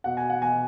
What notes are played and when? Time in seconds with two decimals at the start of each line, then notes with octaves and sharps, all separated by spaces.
0.04 B2 F#5
0.17 G#5
0.30 F#5
0.42 B2 G#5